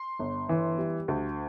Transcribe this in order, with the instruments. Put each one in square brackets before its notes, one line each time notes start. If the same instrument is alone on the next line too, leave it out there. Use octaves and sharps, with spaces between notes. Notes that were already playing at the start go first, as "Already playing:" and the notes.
Already playing: [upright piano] C6
G1
E3
G3
D2